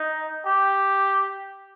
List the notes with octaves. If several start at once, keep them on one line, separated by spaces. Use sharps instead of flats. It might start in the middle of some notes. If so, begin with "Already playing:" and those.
Already playing: D#4
G4